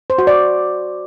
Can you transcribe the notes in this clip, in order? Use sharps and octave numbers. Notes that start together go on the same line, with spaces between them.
C5
F#4
D5